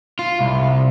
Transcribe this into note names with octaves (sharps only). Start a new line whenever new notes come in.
F4
C2